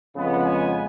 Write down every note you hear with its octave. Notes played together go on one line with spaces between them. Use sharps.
F2 C#3 G#3 B3
G#5